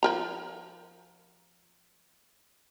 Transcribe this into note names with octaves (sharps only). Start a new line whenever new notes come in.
F3 A#4 A#5